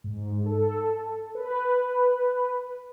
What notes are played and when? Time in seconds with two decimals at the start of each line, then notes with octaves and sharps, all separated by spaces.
0.04 G#2
0.46 A4
1.35 B4